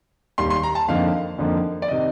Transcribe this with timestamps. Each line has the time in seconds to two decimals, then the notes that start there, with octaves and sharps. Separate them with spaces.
0.38 D#2 D#3 G3 C6
0.50 C6
0.63 A#5
0.75 A5
0.88 F2 D3 F3 A#3 D#4 F5
1.38 F2 D3 F3 A#3 D#4
1.82 D5
1.88 C3 D#3 D#5